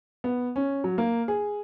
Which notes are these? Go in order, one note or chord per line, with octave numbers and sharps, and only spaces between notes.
B3
C#4
F#3
A#3
G#4